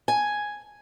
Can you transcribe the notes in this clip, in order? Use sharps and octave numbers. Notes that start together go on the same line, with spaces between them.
G#5